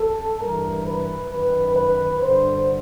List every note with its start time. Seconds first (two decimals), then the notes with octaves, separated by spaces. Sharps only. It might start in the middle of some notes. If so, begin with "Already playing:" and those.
Already playing: A4
0.40 G2 E3 A#4
0.86 B4
1.30 F#2 D#3 B4
1.75 B4
2.21 G2 D3 C5